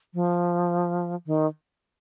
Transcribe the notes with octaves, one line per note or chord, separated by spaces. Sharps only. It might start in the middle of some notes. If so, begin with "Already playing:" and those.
F3
D#3